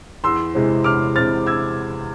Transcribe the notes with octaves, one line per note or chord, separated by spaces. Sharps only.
E2 C6 E6
C3 E3 G#3 C4
E2 D6 F6
C3 E3 G#3 C4 F6 A6
E6 G#6